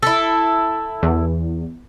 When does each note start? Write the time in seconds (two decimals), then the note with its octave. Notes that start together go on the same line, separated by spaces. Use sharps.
0.03 E4 A4
1.03 E2